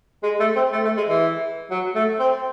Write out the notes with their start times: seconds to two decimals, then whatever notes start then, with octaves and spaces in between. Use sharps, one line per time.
0.23 G#3
0.40 A3
0.56 C4
0.73 A3
0.85 A3
0.97 G#3
1.09 E3
1.70 F#3
1.95 A3
2.19 C4